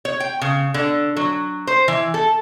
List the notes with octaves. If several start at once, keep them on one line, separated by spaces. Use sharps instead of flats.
C#5
G5
C#3
D3
F#3
C5
E3
A4